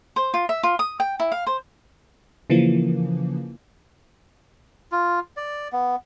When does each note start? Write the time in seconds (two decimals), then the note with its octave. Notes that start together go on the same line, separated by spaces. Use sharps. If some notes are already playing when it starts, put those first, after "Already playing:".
0.16 C5
0.34 F4
0.49 E5
0.63 F4
0.79 D#6
1.00 G5
1.20 E4
1.32 F5
1.47 C5
2.50 C#3 E3 F3 A#3
4.92 F4
5.37 D5
5.73 B3